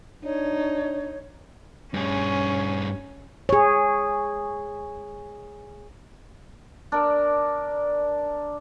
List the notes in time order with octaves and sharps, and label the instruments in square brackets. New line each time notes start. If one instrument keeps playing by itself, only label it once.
[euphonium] D4 [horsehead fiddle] D#4 [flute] C#5
[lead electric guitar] G2 G#4 [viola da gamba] C#4
[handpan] G#4 C#5
[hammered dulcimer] D4 A#4